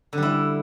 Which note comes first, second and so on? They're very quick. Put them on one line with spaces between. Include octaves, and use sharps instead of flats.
D3 G3 E4